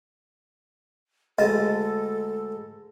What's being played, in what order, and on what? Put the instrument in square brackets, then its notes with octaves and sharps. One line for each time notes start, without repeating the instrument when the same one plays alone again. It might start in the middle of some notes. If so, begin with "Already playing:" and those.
[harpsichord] D2 G#3 A5 [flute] A4 [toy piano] D#5